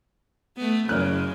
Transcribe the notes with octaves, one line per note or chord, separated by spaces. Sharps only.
A3 B3
F#1 F#2 C#3 F6 F#6